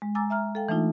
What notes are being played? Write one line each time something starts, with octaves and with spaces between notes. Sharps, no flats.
G#3
G#5 A#5 D6 E6 A6
E5 A#5 F6
A4 F5 G5
E3 A3 D4 D#4 F4